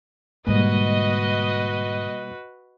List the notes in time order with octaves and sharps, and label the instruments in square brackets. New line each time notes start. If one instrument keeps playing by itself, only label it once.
[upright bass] G#2 D3 [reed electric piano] B2 G3 A#3 [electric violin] F#4 B4 [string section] D#5